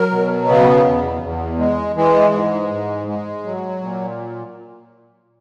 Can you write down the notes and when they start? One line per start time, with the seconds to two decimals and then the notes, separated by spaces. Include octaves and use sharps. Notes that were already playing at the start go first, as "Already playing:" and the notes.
Already playing: F#3 A#4
0.11 B2
0.48 C#3 B3
0.85 E2
1.22 E2
1.59 G#3
1.96 E3 G#3
2.33 G#2
2.70 G#2
3.08 G#3
3.45 F#3
3.82 A#2